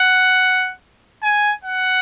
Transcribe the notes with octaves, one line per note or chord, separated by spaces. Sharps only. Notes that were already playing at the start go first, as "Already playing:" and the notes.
Already playing: F#5
G#5
F#5